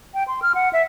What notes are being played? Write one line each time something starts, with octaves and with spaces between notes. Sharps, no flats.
G5
C6
F6
F#5
E5